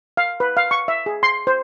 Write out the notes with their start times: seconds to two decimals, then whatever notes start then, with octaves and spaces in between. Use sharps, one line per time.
0.17 F5
0.40 B4
0.57 F5
0.71 C#6
0.88 E5
1.06 G#4
1.23 C6
1.47 C5